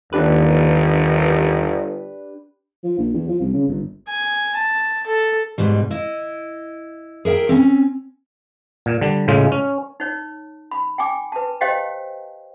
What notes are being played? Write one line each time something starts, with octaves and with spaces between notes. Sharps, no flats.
G1 D#2 D4 G4 B4
F3
A#1
E2
F3
C2
C#3
G1
G#5
A5
A4
G#2 B2 G3
E4 D#5
G#4 A#4 E5 G5
C4 C#4
A#2
D3 G3
A2 C#3 G#3 F4
C#4
D#4 C#5
B5
G5 G#5 D6
B4 A5
G4 C5 C#5 D#5 F5 G5